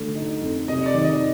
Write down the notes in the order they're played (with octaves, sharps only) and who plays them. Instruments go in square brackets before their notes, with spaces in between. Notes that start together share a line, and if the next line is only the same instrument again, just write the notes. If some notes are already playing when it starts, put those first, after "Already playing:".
Already playing: [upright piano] D3 A3
D#4
F2
[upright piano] C3 [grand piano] D#5
[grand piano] D5
[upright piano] D#3
[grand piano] D#5